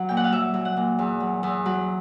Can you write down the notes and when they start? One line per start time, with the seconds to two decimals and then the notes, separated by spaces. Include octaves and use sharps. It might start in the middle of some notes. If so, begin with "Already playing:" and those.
Already playing: F#3
0.09 A#2 G5
0.17 F#5
0.24 F5
0.32 F#3 E5
0.54 F#3
0.65 F#5
0.77 A#2
0.99 E2
1.20 F#3
1.43 E2
1.66 F#3